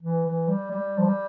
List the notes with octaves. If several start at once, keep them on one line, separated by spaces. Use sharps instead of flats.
E3
E3
G3
G3
F3
G3